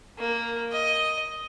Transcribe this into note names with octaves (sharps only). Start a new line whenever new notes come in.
A#3
D#5